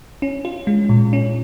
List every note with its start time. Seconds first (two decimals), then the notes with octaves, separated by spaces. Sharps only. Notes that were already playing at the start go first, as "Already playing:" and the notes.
0.22 C#4
0.45 F4
0.67 G#3
0.89 A#2
1.13 C#4